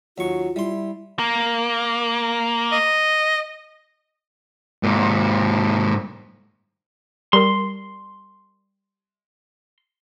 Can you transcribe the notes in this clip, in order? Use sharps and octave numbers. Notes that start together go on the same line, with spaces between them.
D#2 F#3 F4 C#6
G3 E4 C6
A#3
D#5
G#2 A#3
G3 A#4 C6